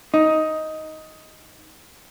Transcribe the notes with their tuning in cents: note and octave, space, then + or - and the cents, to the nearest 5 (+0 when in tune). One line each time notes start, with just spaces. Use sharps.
D#4 +10